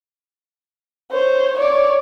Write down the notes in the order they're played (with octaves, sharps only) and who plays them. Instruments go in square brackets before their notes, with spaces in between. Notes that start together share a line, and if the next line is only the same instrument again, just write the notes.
[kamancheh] C5 C#5
C#5 D5